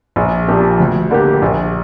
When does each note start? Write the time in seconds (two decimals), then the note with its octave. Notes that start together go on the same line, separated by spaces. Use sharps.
0.16 A#1
0.48 A#2 F3 D4 G4
0.80 D2
1.11 D3 A#3 G4
1.42 A#1